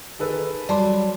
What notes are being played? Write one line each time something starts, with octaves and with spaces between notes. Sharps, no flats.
D#3 G#4 A4 B4
F#3 G3 D5 A5 C6